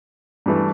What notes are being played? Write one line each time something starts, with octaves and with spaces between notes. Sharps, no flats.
G2 E3 A3